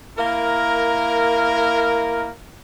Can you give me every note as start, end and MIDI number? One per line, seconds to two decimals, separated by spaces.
0.18 2.29 58
0.18 2.29 64
0.18 2.29 70